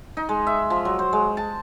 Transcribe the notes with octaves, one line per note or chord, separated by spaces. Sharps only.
D#4
G#3
E5
F3
F#3
C5
G#3
A5